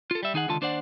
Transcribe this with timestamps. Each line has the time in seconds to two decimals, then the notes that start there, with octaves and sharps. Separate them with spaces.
0.11 F4 A4
0.23 G3 E5
0.34 D#3 D#4 G#4 F#5
0.48 C#2 D3 D#3 F4 A5
0.61 D#2 D4 C5 D5 F#5